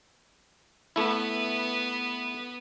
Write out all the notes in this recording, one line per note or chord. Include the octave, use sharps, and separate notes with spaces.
A3 B3 E4 B4